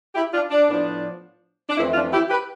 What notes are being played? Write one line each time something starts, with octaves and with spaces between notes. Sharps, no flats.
E4 G4
D4 F4
D4
A2 F3 B3 D4
D4
F2 E3 A3 C4 E4
D4 F4
E4 G4
G4 B4